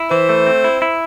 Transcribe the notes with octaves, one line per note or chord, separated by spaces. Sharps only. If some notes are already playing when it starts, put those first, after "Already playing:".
Already playing: E4
E3 C5
A3
C4
E4
E4